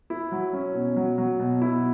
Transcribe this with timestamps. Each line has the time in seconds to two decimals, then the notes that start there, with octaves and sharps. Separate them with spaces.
0.10 E4
0.32 F#3
0.53 C#4
0.74 B2
0.96 F#3
1.18 F#3
1.40 B2
1.62 E4